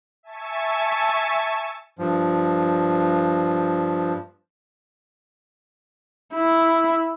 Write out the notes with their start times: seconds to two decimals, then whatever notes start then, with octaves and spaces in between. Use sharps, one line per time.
0.23 E5 G#5 A5 C#6
1.99 G2 F3
6.34 E4